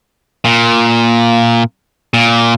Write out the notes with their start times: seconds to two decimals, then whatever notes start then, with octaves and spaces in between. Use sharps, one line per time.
0.45 A#2
2.14 A#2